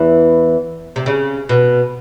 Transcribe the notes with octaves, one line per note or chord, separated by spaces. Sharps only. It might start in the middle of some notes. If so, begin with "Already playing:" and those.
Already playing: E2 E3
C3
C#3
B2